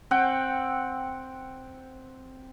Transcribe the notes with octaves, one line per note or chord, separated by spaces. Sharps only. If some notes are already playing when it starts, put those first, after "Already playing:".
C4 F#5 G5